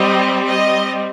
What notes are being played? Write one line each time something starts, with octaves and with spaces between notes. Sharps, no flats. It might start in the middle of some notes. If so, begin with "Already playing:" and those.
Already playing: G3 C4 D#5
D#5